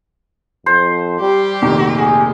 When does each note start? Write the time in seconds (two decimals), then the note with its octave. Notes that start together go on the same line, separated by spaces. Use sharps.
0.66 F2 C5
1.20 G3 G4
1.62 F1 A#2 D#3
1.98 G#4